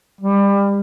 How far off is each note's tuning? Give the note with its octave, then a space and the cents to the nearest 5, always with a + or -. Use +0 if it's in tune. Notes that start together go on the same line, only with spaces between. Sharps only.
G3 +25